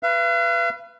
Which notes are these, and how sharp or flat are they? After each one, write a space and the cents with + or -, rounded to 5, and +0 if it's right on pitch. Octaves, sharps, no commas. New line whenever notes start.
B4 +0 F5 -45